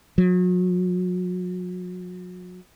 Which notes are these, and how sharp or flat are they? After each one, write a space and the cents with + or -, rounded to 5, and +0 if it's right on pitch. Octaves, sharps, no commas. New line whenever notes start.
F#3 -40